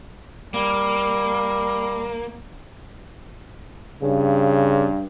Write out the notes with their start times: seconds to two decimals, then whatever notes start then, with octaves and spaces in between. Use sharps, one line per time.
0.54 G3 A#3
4.02 G2 C#3